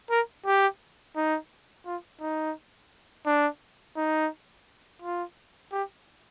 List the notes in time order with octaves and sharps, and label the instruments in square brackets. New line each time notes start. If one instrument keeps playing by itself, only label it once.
[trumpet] A#4
G4
D#4
F4
D#4
D4
D#4
F4
G4